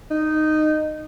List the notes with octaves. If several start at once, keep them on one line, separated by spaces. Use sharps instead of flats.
D#4